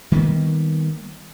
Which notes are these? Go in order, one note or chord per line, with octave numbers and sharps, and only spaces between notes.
D#3 G3 A#3 B3